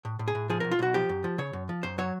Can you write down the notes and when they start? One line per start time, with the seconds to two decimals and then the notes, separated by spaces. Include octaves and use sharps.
0.05 A2
0.19 A2
0.28 G#4
0.35 A2
0.50 F3 G#4
0.60 B1 A#4
0.71 F4
0.79 B1 F#4
0.94 F3 G4
1.09 F#2
1.24 F3
1.38 C#3 C#5
1.53 F#2
1.69 F3
1.83 F#2 C5
1.98 F#3 C#5